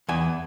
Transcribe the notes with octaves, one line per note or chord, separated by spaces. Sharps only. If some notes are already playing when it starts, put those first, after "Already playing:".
E2 G#5